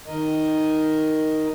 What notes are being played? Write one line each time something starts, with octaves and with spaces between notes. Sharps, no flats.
D#3 A#4 D#5